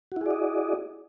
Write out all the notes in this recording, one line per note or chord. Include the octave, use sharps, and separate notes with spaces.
E4 F#4 G#4 D5 D#5